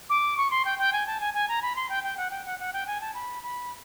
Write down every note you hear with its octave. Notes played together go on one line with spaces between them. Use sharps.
D6
C#6
C6
G5
G5
G#5
A5
G#5
G#5
A#5
B5
C6
G5
G5
F#5
G5
F#5
F#5
G5
G#5
A5
B5
B5